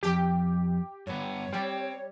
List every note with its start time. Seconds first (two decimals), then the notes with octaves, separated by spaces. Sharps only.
0.03 F2 G4
1.07 G2 B3 C#5
1.53 G3 C4